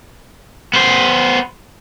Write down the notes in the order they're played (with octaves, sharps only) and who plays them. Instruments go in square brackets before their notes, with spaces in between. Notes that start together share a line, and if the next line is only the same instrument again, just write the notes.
[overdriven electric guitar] B3 C5